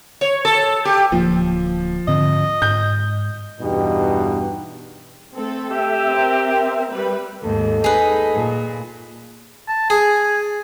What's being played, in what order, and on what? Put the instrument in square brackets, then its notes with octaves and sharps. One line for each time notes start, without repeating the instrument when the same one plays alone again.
[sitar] C#5
A4
G4
[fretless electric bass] D1 A#3 [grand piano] F3
[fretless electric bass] G#2 D3 C4 [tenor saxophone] D#5
[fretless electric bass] G#2 [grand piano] G6
[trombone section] E2 G2 B2 D#4 G4
[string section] A3 C4 A4
[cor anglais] G4 [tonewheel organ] E5
[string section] C4 A#4
G3 B4
[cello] D#2 G#2 [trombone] A4
[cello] D#4 [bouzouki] G#4 B4
[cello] A#2
[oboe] A5
[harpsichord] G#4 [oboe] G#5